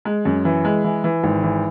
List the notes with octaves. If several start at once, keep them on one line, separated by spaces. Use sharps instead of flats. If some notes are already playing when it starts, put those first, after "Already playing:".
G#3
F#2
E3
G#3
E3
E3
G#1
E3